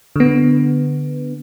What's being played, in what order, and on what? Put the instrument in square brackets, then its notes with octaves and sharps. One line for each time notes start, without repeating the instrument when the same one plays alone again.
[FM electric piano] D3 B3